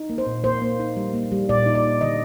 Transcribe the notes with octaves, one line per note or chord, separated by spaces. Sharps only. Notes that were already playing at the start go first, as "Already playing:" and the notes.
Already playing: D#4
A#3
C5
A#2
A#3 C5
A#3
D#4
G3
A#3
G3
A#2 D5
D#4
D5
D#4
D3 D#5